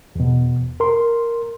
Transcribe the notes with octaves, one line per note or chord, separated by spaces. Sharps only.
E2 B2
A#4 C6